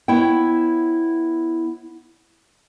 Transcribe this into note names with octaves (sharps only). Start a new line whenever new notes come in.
B3 E4 C#5 G5